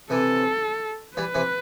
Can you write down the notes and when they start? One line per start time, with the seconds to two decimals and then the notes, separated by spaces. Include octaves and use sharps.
0.10 C3 E3 A4
1.17 E3 G3 B4
1.35 C3 E3